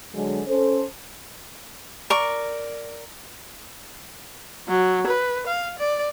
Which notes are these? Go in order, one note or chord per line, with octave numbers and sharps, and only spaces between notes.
D3 F#3 G#3
C#4 A4 C5
A#4 D5 C#6
F#3
B4
F5
D5